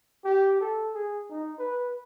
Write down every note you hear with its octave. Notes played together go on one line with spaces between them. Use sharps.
G4
A4
G#4
D#4
B4